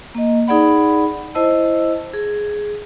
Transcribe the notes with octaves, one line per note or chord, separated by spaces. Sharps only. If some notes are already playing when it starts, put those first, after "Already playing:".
A#3 D#5
D#4 G#4 D5 F#5 B5
E4 C5 D#5 A5 E6
G#4